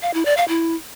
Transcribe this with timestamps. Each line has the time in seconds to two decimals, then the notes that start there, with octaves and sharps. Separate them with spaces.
0.02 F5
0.14 E4
0.25 D5
0.37 F5
0.48 E4